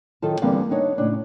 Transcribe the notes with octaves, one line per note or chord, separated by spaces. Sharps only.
F#2 D#3 F4 A4 A5
E2 D3 G3 A#3 C4 F5
B3 D4 D#4 C#5
A2 C#3 C#4 D4